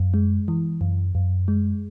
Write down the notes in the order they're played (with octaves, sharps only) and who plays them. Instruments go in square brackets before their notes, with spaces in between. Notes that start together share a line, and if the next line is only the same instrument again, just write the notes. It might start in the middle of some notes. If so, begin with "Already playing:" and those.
Already playing: [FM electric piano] F#2
G#3
E3
F#2
F#2
G#3